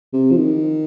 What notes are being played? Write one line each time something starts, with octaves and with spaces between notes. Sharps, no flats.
C3
F3
D#3